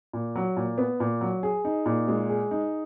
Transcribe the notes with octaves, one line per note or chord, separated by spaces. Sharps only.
A#2
F#3
A#2
B3
A#2
F#3
G#4
D#4
A#2
G#3
G#4
D#4